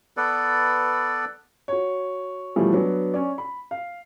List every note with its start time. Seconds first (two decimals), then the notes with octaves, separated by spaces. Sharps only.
0.17 B3 A4 B4 D5
1.68 F#4 C#5
2.56 B2 E3 F3 G3 A3
2.73 F#3 B3 D4
3.14 C#4 D5
3.38 B5
3.71 F5